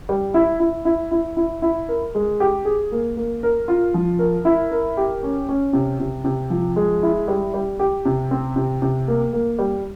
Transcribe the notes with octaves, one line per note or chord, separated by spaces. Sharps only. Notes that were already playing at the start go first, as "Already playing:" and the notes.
G3
E4
E4
E4
E4
E4
E4
A#4
G#3
G4
G#4
A#3
A#3
A#4
F4
F3
A#4
E4
A#4
G4
C#4
C#4
C3
C3
C3
F3
G#3
E4
G3
G3
G4
C3
C4
C3
C3
A#3
A#3
G3